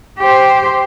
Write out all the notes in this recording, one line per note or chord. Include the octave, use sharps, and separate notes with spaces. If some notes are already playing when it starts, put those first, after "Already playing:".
G4 C5